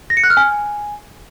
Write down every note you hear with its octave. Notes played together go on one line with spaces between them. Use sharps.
A#6
C#7
F#6
F6
G#5